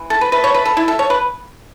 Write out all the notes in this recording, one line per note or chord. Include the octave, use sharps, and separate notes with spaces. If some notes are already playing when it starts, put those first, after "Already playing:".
Already playing: E3
A3 A4
B4
A3 B4
C#5
A3 B4
A4
A3 E4
A4
A3 C#5
B4